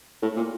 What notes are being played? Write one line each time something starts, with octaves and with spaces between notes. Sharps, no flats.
A2
A#2